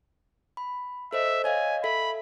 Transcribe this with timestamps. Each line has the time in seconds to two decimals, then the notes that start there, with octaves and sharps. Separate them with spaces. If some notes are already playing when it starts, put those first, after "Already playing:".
0.57 B5
1.13 A4 C5 D#5 E5
1.44 C#5 D#5 F5 G#5
1.84 A4 E5 B5 B6